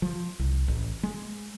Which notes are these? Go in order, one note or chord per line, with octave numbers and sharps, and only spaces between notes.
F3
C2
A1
G#3